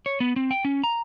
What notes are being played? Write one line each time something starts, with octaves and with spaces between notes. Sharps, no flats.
C#5
B3
C4
G5
C#4
A#5